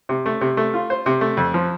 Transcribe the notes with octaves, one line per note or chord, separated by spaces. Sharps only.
C3
A3
C3
A3
F4
C5
C3
A3
F2
F3